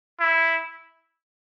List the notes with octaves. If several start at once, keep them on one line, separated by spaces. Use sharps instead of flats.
E4